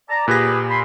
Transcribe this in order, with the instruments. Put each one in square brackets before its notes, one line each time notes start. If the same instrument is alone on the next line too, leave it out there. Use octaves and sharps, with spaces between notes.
[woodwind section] D5 A5 A#5
[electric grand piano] A#2 G4 A#6 [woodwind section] G#4 B4
[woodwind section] G#5 B5 C6